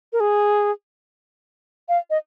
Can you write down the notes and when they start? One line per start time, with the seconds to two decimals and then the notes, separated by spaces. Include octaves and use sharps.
0.13 A#4
0.20 G#4
1.89 F5
2.10 D#5